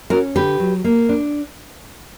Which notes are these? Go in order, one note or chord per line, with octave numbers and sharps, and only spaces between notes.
C#4 F#4 A#4
D3 G4 B4
F#3
A#3
D4